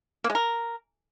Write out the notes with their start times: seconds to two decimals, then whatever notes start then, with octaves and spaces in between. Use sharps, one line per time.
0.24 A#3
0.30 G#3
0.35 A#4